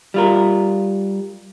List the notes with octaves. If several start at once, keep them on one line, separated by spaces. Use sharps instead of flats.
G3 F4 A#4